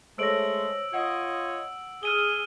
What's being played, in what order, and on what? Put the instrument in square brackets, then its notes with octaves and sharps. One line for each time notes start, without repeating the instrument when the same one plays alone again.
[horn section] G#3 A3 [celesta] C5 C#5 A#6 [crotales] E6 D7 F#7
[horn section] F4 C#5 D#5 [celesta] F#5
[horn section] G#4 [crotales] F6 D#7 G7